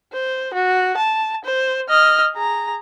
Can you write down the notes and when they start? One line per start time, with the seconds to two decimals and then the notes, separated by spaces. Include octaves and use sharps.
0.13 C5
0.54 F#4
0.97 A5
1.44 C5
1.89 D#5 F6
2.34 G#4 A#5